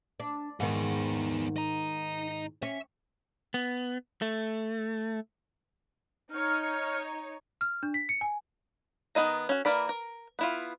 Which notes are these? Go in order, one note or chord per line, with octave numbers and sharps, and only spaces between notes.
D4
G#2 D#3 B3 G#4
D#5 A#5
C#4 E5
B3
A3
D#4 C#5 F6
F6
D4
B6
C#7
G#5
D#3 B3 F4 D#5 A#5
C#4 F#4
E3 A#3 A#4 D5 B5
A#4
B3 E4 F4